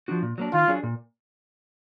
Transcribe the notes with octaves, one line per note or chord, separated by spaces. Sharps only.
F3 G#3 D4 F#4
A#2
F#3 A#3 D4
D#3 F4
F#3 D4 G#4
A#2